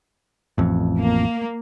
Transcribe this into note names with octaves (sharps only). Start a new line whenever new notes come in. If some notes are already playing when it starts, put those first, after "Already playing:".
A1 F2
A#3